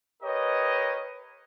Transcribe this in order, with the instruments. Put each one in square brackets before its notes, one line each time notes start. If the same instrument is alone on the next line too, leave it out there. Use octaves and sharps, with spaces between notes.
[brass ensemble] G4 A#4 B4 C#5 D#5